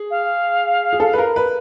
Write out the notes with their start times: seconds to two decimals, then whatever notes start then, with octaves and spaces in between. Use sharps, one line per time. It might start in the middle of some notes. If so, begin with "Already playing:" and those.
Already playing: G#4
0.10 F5
0.93 G#4
1.00 A4
1.13 B4
1.18 A#4
1.36 B4